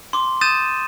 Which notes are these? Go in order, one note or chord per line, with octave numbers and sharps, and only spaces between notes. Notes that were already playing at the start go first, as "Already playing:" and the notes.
C6 D6
D#6 G6 A6 D#7 E7